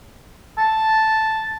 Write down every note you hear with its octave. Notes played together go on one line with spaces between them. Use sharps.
A5